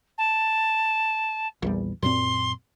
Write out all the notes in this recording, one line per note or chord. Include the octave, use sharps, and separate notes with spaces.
A5
A#1 E2 G3
F#2 A#2 C4 C6